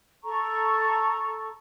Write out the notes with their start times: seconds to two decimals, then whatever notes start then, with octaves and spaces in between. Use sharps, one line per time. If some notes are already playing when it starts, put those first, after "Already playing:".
0.24 A4 A#5 C#6